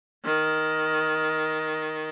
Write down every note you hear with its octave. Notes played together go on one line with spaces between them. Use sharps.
D#3